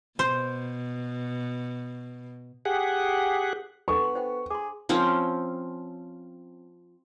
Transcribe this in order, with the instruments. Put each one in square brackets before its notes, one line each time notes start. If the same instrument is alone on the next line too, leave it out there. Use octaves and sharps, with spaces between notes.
[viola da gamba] B2 [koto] C5
[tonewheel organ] G4 G#4 F#5
[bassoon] B3 [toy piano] D4 A4 G#5 [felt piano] C#6
[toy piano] C6
C5 F#5 G5
[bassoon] G#4 [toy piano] C6 D6
[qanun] F3 C4 C#4 C5